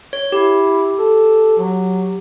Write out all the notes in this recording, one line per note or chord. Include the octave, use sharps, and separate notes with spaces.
C#5
E4 G4
A4
F#3